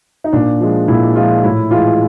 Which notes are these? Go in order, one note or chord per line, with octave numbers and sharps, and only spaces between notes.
D#4
A#2 D4
F3 G#3
A#2 E4
F3 G#3 F4
A2 E4
E3 G#3 F4